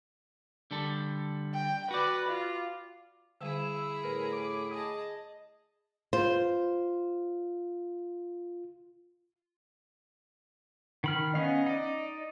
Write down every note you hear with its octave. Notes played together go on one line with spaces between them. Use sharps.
D3 G3 A4
G5
F#4 B4 D5
F4
D3 G3 E4 G#4 E6
A2 A#4 B4
D6
G#4 D#5 A5
F4 C5
D#3 B5 F6
B3 C#4 D#5 F5
D#4 D5